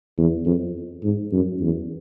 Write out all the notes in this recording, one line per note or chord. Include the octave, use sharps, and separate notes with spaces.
E2
F2
G#2
F#2
E2